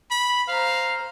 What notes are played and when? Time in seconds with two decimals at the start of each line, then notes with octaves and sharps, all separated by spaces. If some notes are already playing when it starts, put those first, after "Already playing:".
0.11 B5
0.48 C5 F5 A#5